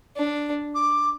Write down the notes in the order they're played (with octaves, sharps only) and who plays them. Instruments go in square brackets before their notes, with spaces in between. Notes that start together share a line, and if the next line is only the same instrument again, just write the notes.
[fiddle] D4
[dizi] D6